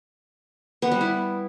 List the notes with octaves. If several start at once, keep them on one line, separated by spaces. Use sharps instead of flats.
B3
G3
E4